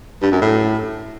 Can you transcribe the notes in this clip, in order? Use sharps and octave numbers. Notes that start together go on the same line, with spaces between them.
G2
F#2
A2